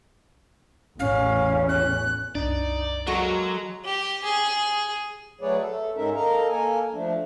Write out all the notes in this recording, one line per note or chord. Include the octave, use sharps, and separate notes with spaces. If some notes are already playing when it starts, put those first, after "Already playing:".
A1 E2 C#4 F5
F#6
C2 F#2 D4 D#4 D5
F#3 G#3 A#3 F#4 A4 A#5
G4
G#4
F#3 A3 G#4 B4 C#5 D5
A3 A4
G#2 G#3 C#4 D#4 A#4 E5
A4 A#4 D#5 F5 A#5
A#3 A4 A#4 G#5
F3 A3 D4